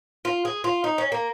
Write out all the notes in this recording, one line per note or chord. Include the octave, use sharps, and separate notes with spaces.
F4
G#4
F4
D#4
C#4
A#3